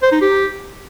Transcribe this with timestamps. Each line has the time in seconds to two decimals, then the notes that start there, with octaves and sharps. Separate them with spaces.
0.02 C5
0.12 D#4
0.22 G4